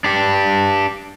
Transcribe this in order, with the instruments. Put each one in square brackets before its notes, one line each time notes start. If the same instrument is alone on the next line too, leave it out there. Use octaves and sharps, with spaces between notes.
[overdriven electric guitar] D4 G4